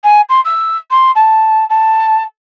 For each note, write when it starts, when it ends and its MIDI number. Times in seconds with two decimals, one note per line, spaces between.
0.04 0.21 80
0.29 0.40 84
0.45 0.77 88
0.91 1.11 84
1.15 1.64 81
1.70 2.23 81